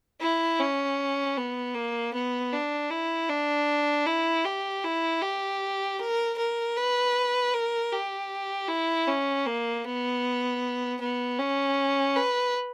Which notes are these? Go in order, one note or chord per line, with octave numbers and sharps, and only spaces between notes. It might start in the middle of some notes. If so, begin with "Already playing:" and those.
E4
C#4
B3
A#3
B3
D4
E4
D4
E4
G4
E4
G4
A#4
A#4
B4
A#4
G4
E4
C#4
A#3
B3
B3
C#4
B4